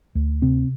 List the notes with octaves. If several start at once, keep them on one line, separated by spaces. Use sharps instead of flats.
D2
C3 C4